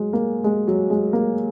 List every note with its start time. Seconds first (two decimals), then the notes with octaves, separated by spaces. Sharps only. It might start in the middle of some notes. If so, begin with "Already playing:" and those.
Already playing: F#3 G#3
0.13 A#3
0.44 G#3
0.67 F#3
0.90 G#3
1.13 A#3